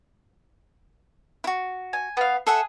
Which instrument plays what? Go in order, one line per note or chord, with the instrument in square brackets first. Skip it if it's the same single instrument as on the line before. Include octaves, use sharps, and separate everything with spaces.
[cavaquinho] E4 F#4
[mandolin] G#5
B3 F5
[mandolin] G#4 [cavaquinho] A4 E5 F#5